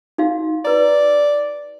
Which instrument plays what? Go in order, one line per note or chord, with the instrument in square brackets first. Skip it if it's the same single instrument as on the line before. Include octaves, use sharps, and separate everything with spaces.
[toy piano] D#4 F#4 F5
[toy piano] B4 A#5 [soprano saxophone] D5